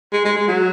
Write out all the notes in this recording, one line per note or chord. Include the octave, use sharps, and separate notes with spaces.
G#3
G#3
G#3
F#3